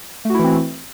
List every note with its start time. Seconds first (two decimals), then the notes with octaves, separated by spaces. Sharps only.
0.25 A3
0.30 F#4
0.34 E4
0.39 E3
0.44 C4